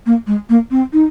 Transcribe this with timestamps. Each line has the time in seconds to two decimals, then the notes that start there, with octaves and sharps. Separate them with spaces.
0.06 A#3
0.27 G#3
0.49 A#3
0.71 C4
0.93 D#4